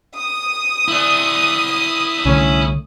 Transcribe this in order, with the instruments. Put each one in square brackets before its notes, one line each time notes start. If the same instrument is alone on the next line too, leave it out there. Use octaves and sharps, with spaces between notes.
[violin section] D#6
[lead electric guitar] E4 D5
[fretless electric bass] C2 D3 A3 [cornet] C#4